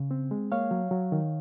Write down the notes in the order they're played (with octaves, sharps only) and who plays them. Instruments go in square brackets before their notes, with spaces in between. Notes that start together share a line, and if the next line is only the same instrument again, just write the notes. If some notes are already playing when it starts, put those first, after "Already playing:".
Already playing: [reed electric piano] C#3
C4
G#3
A#3 C#5 F5
F#3
F#3
D#3